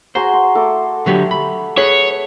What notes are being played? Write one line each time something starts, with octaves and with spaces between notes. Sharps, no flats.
F#4 G#4 C5 A#5
C6
A3 A4 D6
D3 F#3 G4
B5
G#4 B4 C#5